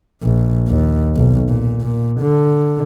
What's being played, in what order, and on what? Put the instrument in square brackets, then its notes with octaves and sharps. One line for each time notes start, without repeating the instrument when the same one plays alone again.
[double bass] A#1
D#2
B1
A#2
A#2
D3